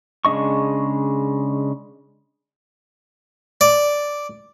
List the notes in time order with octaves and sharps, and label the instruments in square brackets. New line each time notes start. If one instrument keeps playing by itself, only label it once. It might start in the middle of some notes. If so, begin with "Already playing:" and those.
[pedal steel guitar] C#3 G#3 D4 D#5 C#6
[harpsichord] D5